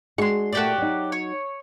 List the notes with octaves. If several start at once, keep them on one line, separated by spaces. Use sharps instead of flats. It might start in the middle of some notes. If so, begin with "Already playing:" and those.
G#3 D4 F#4 C6 C#6
A#2 A3 F#4 G4 D5
F#3 D#4
C#5